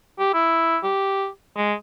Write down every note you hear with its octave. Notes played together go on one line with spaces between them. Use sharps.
G4
E4
G4
G#3